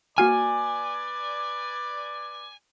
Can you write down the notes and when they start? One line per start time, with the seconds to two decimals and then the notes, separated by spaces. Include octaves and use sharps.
0.18 A#3 F#4 B4 D5 G#5 F6